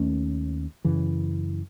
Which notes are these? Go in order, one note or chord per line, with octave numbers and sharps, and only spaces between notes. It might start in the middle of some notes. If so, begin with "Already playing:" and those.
Already playing: D#2 A3 C#4
F#2 C#3 E3